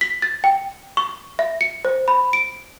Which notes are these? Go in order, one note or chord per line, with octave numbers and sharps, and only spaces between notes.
B6
A6
G5
C#6
E5
C#7
C5
B5
D7